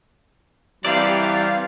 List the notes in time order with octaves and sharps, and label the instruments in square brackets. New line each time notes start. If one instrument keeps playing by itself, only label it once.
[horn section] C3 E3 [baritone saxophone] G3 [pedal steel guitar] C4 D5 [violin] F5 A6